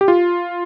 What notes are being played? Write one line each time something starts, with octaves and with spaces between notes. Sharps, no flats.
G4
F4